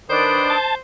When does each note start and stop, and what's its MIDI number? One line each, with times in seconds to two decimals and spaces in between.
0.10 0.54 51
0.10 0.57 62
0.10 0.54 71
0.10 0.79 72
0.10 0.57 87
0.50 0.75 81